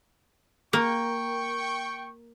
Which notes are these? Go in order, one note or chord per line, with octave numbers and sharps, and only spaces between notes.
A#3 G5 C#6